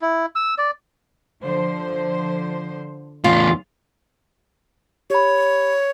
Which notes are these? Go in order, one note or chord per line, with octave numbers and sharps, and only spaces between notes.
E4
E6
D5
D3 F3 C5
E2 A2 F4
G4 C#5 B5